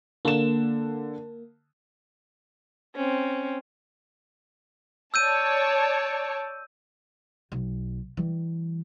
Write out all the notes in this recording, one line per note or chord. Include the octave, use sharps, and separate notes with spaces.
D3 A#3 E7
C4 C#4
C#5 D5 A5 E6 G6 D#7
B1
E3 G3